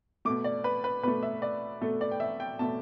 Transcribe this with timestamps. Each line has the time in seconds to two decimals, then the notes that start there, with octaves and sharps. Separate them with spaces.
0.25 B2 A3 D6
0.44 D5
0.64 B4
0.84 B4
1.03 B2 A3 B4
1.23 E5
1.42 D5
1.81 B2 A3 A4
2.01 D5
2.11 G5
2.20 E5
2.40 G5
2.59 B2 A3 A5